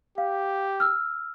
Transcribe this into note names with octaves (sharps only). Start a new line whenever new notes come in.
G4 F5
E6 F6